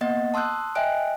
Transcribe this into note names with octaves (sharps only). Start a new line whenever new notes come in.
A#3 B3 D#5 F#5 A6
A5 C6 D#6 E6 F#6 G6
D#5 E5 G5 G#5 F#6 D7